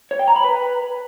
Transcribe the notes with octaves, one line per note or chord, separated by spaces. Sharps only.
C#5
G5
A#5
B5
B4